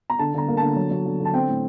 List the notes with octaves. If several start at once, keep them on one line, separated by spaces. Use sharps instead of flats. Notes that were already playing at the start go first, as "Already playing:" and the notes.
A#5
D3 A5
D3 A#5
A#3
D3 A5
F#3
F#3
D3
D3
A5
C4 G5
A2